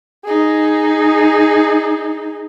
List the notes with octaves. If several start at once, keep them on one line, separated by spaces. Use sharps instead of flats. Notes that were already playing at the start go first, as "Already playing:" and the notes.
D#4 G#4